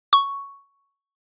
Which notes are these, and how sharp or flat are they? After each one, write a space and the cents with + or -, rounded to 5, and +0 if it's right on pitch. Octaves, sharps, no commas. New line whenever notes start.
C#6 +5